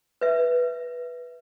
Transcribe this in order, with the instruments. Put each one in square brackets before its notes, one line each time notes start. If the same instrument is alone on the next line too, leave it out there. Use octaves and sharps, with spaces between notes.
[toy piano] B4 E5